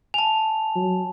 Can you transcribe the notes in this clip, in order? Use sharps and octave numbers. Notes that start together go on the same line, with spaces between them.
G#5 A5 F7
F#3